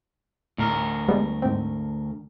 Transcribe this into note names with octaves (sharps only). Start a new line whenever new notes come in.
D2 A2 A#4
G3 G#3 B3
G#2 C4